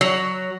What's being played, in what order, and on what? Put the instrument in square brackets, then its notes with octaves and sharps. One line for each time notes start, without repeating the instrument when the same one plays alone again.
[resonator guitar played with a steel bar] F#3